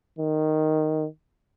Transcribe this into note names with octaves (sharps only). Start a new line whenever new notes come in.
D#3